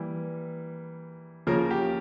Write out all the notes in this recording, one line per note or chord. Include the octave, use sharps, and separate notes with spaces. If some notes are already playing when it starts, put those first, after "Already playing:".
Already playing: E3 G3 A#3
C#3 F3 A#3 A#4
G4